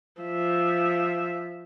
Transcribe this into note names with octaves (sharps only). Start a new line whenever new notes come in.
F3 E5